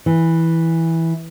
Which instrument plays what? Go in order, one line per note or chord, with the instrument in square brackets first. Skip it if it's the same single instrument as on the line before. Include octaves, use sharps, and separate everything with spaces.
[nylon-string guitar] E3